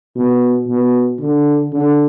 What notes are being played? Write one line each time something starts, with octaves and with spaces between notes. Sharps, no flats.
B2
B2
D3
D3